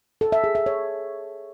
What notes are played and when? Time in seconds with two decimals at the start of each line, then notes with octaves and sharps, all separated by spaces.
0.21 A4
0.32 E5
0.44 G#4
0.55 E5
0.66 C#5